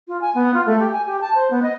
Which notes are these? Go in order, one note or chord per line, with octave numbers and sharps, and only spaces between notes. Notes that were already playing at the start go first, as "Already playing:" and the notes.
F4
G#5
B3
F4
A3
G4
G#5
G4
A5
C5
B3
D#5